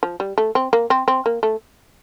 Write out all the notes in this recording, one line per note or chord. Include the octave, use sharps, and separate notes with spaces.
F3
G3
A3
C4
A#3
C4
C4
A#3
A3